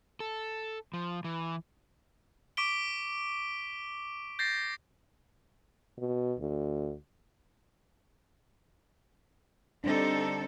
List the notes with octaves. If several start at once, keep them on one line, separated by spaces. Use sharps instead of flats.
A4
F3
E3
C#6 D6 B6 D7 G7
G6 A6 A#6 C7
B2
D2
D3 G3 C4 D4 D#4 A4